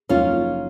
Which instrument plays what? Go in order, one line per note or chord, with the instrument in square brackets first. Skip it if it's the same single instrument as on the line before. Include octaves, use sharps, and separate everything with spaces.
[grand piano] F#1 F#2 F3 A#3 D#4 [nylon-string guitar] C#4 F4